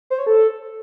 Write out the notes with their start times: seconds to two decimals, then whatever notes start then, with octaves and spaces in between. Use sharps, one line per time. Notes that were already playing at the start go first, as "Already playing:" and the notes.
0.10 C5
0.19 C#5
0.27 A4